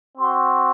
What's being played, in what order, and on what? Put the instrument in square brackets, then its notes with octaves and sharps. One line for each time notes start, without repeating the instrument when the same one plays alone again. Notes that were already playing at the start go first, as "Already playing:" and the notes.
[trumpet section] C4 F#4 C6